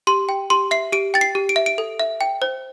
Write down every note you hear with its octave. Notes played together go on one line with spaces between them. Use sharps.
G4 C6
G5
G4 C6
E5 C7
G4 D7
G5 A6
C7
G4
D7
E5
D7
A4
E5
G5
C5